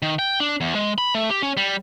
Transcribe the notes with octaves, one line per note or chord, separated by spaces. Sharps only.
D#3
G5
D4
E2
G#3
B5
A3
G4
C#4
G3